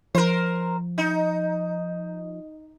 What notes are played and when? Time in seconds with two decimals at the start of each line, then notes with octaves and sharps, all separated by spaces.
0.15 F3 A#4 C5
0.98 D#4